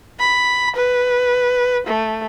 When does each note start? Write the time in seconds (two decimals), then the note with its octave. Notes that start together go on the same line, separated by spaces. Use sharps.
0.20 B5
0.76 B4
1.87 A3